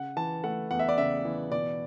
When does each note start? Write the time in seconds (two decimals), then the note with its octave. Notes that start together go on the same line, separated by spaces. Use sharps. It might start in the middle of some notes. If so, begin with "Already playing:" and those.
Already playing: C#3 F#5
0.17 E3 A5
0.44 A3 F#5
0.71 E2 F#5
0.79 E5
0.89 D5
0.97 C#3 E5
1.25 E3
1.52 B2 D5